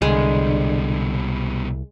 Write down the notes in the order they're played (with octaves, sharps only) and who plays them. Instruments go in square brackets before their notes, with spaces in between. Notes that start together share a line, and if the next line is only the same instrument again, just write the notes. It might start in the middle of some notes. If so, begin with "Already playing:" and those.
[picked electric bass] C2 [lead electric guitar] B2 G3 [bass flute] D3 [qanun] G#3